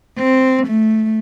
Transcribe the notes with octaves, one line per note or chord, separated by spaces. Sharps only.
C4
A3